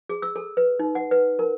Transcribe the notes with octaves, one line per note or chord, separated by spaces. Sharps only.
G#4
E6
A4
B4
D#4
F#5
B4
A#4